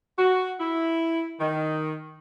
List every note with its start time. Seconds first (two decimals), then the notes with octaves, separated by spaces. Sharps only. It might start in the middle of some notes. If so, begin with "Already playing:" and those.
0.19 F#4
0.60 E4
1.40 D#3